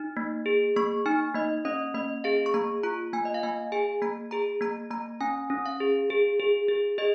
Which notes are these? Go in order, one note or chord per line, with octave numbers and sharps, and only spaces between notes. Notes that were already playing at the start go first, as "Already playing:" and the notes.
Already playing: D#4
A#3
G#4
A#3 C#6
D#4 G#5
A#3 D#5
C#4 D#5
A#3 D#5
G#4 F5
C#6
A#3 A#5
F4 A#5
A#3 G#5
D#5
F5
A#3 G#5
G#4 G#5
A#3 A#5
G#4 A#5
A#3 A#5
A#3 A#5
C#4 G#5
C#4
F5
G#4
G#4
G#4
G#4
G#4 D#5